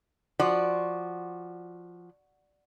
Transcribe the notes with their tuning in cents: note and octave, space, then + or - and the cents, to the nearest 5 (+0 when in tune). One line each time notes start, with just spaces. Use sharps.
F3 +0 F#4 +0 D5 +0